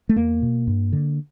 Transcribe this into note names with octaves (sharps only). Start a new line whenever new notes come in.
A3
E2 A#3
B2
G2
D3